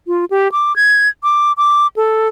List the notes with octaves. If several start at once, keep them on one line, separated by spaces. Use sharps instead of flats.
F4
G4
D6
G#6
D6
D6
A4